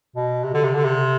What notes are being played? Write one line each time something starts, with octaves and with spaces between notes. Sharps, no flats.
B2
C3
D3
C3
D3
C3